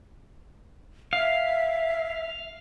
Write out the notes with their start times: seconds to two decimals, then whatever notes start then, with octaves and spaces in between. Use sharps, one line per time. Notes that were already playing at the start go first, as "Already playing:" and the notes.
1.13 E5 F5